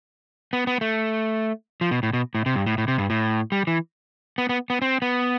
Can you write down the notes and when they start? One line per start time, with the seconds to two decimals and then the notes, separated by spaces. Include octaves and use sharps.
0.53 B3
0.67 B3
0.81 A3
1.81 F3
1.91 B2
2.03 A2
2.13 B2
2.35 A2
2.46 C3
2.56 G2
2.66 A2
2.78 A2
2.88 C3
2.98 G2
3.10 A2
3.52 G3
3.67 E3
4.38 B3
4.49 B3
4.70 B3
4.82 C4
5.02 B3